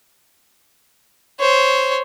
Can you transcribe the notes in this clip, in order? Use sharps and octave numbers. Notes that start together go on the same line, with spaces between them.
C5 C#5